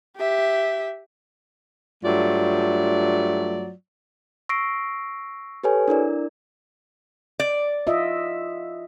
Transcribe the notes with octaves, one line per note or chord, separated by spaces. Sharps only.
G4 E5
G2 F#3 A3 F4 D5
C#6 E6 A#6 C7 D7
G4 A4 B4 C#5 G#5
D4 E4 A#4 D5
D5
F4 D#5 E5